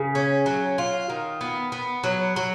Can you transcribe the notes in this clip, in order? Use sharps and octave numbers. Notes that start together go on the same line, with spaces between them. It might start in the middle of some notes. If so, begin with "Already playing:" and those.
Already playing: C#3
C#4
F#3
F4
D#3
B3
B3
F#3
F#3